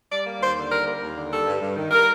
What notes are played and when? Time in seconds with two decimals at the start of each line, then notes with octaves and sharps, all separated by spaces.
0.11 G3 D5
0.25 A#3
0.40 D#2 C5
0.56 D3
0.71 G3 A#4
0.86 A#3
1.01 D#2
1.16 D3
1.31 G3 A4
1.46 G2
1.61 G2
1.76 D#3
1.91 G3 A#4